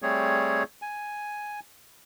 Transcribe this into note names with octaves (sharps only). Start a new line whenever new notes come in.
G3 A3 C4 G#4 C#5
G#5